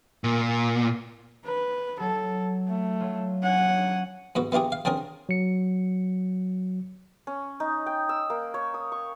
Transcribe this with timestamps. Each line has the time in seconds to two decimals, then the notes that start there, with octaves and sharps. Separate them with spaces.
0.24 A#2
1.45 B4
2.00 F#3 A4
2.68 A3
3.00 F#3 F4
3.43 C#4 F#5 G#5
4.35 G#2 B3 F#4
4.52 B3 E4 F4 G4 G#4
4.72 F5
4.85 D3 C4 C#4 G#4 A#4
5.29 F#3 C#7
7.27 C#4
7.60 D#4
7.86 G5
8.09 E6
8.30 A#3
8.54 C#5
8.74 D#6
8.92 C#6